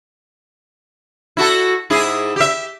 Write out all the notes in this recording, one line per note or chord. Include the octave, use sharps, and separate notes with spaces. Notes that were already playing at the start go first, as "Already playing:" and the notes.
E4 F#4 A4
G#2 E4 G#4
G4 E5